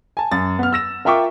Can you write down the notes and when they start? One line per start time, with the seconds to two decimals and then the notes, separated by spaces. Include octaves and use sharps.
0.17 G#5 A5
0.31 F#2 A6
0.59 B3 F6
0.73 E6 A#6 E7
1.05 F4 A#4 E5 G5 C#6 D6